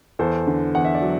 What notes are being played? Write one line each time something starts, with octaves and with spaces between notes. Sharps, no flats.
E2 A4 C5
D3
E2 F#5
E5
D5
F#3